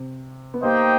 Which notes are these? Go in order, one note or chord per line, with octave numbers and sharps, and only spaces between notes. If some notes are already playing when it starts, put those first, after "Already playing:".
Already playing: C3 C4
B3
A#3 D#4 G4 C5 D#5 G5